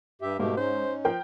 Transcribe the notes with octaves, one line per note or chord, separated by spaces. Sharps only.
G2 G4 E5
G#2 B2 A3 A#3 G4
C#4 D#4 C5
F3 A#4 G5